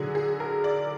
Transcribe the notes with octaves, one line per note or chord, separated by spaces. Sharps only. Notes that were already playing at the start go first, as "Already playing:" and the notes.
Already playing: D3 F#3 G#4
G#4
A#4
D5